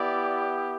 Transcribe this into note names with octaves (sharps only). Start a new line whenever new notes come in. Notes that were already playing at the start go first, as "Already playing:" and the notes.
Already playing: B3 E4 G4 D5